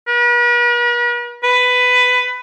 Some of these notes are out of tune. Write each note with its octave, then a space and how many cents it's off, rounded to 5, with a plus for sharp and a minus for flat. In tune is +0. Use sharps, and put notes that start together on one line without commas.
B4 -45
B4 +10